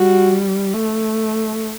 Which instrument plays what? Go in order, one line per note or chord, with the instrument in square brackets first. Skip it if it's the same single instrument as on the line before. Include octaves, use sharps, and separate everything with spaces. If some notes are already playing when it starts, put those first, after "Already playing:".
Already playing: [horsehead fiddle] G3 [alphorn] F#4
[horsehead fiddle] A3